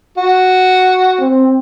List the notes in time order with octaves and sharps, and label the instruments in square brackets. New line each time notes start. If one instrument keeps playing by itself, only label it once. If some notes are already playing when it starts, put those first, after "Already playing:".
[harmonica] F#4
[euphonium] C4